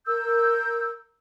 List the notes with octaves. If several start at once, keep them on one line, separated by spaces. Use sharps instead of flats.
A#4 E6 G6